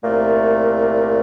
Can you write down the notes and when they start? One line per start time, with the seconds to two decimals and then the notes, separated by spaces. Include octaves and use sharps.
0.04 C2 A#2 A3